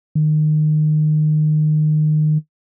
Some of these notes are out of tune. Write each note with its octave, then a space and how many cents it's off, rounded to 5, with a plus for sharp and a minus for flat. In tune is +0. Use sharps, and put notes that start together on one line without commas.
D#3 -25